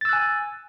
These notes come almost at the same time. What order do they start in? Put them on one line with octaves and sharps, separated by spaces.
A6 E6 F#6 G#5